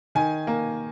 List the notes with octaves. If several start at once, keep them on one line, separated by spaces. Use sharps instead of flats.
D#3 G#5
A#3